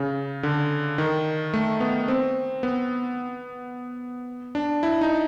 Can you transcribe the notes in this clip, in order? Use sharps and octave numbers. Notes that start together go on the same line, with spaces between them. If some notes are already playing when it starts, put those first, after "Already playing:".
Already playing: C#3
D3
D#3
A3
B3
C4
B3
D4
E4
D#4